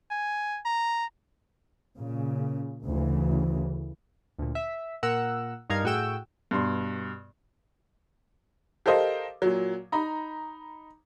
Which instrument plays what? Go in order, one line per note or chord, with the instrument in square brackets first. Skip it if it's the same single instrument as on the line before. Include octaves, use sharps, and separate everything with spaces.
[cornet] G#5
A#5
[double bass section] A#2 C#3
D2 C#3 E3
[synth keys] D2 A#2
E5
A#2 A#4 F#5 E6
G2 D#4 A#4 F5 G#6
A2 F#4 G#4 G5 E6
[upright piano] G2 B2 C6
G4 A4 A#4 C5 D#5 F5
A#2 F#3
D#4 A#5 B5